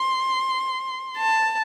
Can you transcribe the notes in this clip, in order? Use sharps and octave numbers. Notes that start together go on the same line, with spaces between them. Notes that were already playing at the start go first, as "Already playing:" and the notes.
Already playing: C6
A5